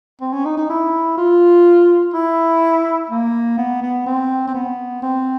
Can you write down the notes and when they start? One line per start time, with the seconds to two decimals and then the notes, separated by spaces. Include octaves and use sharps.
0.21 C4
0.33 C#4
0.45 D#4
0.57 D#4
0.70 E4
1.17 F4
2.14 E4
3.10 A#3
3.58 B3
3.82 B3
4.06 C4
4.47 C4
4.54 B3
5.02 C4